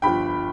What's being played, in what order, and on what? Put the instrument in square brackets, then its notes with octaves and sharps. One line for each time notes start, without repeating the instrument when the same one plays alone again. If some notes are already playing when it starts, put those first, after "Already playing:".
[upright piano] G1 G2 F3 G5 B5